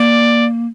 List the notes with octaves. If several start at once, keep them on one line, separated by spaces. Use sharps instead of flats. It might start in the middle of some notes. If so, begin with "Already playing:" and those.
Already playing: A#3 D5